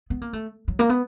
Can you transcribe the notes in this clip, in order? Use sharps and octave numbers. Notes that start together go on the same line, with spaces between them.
B3
A#3
A3
F#3
A#3
B3